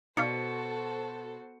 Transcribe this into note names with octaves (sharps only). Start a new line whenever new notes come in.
B2 D#4 F#4 A4 C5 D5 F5 C#7